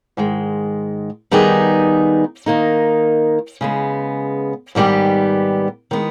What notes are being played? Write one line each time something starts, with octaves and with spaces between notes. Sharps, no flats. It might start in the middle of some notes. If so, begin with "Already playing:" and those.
G#2 D#3 G#3
D#3 G3 B3 D#4 G#4
D#3 A#3 D#4
C#3 G#3 B3
G#2 D#3 G3 B3 G4
D#3 G#3 B3